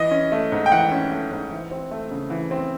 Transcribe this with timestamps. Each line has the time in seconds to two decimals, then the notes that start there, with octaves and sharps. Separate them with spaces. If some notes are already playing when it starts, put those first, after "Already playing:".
Already playing: E3 D#5
0.11 C#4
0.32 A3
0.52 G#2
0.66 G5
0.71 E3 F#5
0.92 C#4
1.12 A3
1.32 G#2
1.51 E3
1.71 C4
1.91 A3
2.11 C#3
2.30 E3
2.51 C4